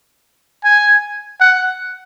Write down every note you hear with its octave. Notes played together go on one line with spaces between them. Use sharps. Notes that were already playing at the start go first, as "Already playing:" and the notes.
G#5
F#5